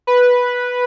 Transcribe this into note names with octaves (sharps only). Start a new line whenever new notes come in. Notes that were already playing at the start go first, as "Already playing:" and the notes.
B4